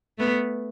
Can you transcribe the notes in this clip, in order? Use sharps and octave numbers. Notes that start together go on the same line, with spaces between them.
A3 B3